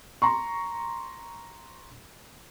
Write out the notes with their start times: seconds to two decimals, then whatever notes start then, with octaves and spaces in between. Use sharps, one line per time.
0.22 A#5 C6 C#6